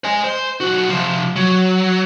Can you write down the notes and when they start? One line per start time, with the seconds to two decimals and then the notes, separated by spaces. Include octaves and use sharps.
0.04 D#5 G#5
0.24 C5
0.61 B1 F#4
0.90 C3 F3
1.36 F#3